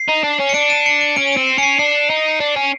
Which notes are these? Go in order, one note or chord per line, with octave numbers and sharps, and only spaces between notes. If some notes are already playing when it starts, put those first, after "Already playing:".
Already playing: C7
D#4
D4
C#4
C#7
D4 D7
D#7
C#7
D7
C#4 D7
D#7
C4 D7
C7
C#4 C7 C#7
D4 C7
D#4
D4
C#4